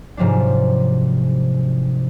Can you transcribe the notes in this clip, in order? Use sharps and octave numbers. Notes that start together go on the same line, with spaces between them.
G#2 C3 F3 F#3 D4